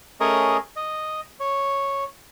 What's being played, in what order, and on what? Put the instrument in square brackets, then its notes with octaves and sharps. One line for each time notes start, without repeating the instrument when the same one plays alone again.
[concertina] A3 C#4 G#4 A#4 C#5 D#5
D#5
C#5